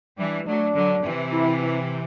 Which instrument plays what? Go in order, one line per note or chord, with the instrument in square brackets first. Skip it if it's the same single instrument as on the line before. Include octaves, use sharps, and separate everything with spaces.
[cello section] E3 G3 [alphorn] D4
[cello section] F#3 A3 [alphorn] D4
[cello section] D3 F#3
C3 E3
[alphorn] E4
E4